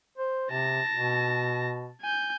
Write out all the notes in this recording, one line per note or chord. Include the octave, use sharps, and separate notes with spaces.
C5
C3 A5 A#6
B2
G#5 G6